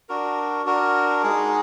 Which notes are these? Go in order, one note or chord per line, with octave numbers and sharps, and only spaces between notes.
D4 F#4 A#4
D4 F#4 A#4
G#3 D#4 G#4